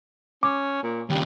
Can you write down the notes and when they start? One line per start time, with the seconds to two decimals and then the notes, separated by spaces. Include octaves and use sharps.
0.43 C#4 D6
0.83 A#2
1.10 D#2 C#3 G3